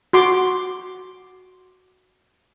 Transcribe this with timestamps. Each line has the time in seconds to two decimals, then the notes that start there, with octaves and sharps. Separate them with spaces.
0.13 F#4 C6 D6